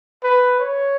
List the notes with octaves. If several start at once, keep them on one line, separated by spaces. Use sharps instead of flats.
B4
C#5